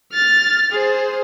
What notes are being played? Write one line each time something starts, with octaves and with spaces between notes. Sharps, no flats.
F6 A6
G#4 C5